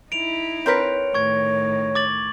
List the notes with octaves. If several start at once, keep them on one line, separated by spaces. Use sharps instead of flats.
D#4 E4 D7 F7
C4 A#4 B4 C#5
A2 D#3 C#6 G#6
D6 A6 F#7